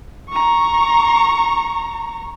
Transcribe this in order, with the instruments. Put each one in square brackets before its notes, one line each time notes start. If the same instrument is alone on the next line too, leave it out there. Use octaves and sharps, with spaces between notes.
[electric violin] A#5 C#6